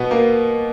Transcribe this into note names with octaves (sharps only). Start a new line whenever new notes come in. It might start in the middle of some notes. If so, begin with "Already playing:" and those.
Already playing: B2 B3
A#3